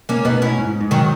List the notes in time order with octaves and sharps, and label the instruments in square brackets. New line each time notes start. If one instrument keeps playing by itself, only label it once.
[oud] A#3 C#4
[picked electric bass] B2 [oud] B3 D#4
[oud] C#4 E4
[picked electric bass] G#2
G#2
[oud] D#3 F#3